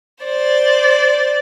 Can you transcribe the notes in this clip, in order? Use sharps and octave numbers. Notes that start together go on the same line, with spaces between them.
C5 D5